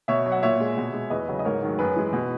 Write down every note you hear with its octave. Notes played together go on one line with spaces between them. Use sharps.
B2 C#5 E5
F#3
F#5
A#2 C#5 E5
G#3
B2
G#3
E2 B4 D#5
C#3 F#3
D#5
G#2 A#4 C#5
D#3 F#3
F#2 G#4 B4
E3 G#3
B2